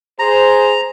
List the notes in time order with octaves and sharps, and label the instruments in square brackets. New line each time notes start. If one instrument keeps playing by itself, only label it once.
[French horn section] G#4 C5 [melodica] A#5